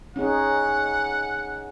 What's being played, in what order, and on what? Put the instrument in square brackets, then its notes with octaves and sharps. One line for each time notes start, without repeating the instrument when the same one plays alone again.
[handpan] C#4 D#4 G#4 [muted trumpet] F#5